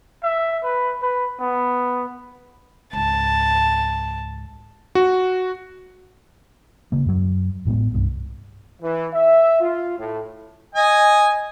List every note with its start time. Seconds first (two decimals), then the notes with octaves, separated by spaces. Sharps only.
0.23 E5
0.63 B4
1.02 B4
1.40 B3
2.93 C#2 G#2 A5
4.95 F#4
6.92 C#3 A#3
7.06 F#2 F#3
7.65 A1 A2 G#3 B3
7.94 C2 G2
8.82 E3
9.13 E5
9.61 F4
9.98 A2
10.75 D#5 G#5